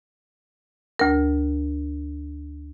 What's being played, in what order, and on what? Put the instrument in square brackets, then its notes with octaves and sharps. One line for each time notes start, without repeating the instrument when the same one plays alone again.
[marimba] D2 A#4